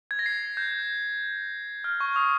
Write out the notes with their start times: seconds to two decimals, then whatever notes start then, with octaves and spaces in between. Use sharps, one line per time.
0.11 G#6
0.19 A#6
0.26 C7
0.57 G6
1.84 F6
2.00 C#6
2.16 D#6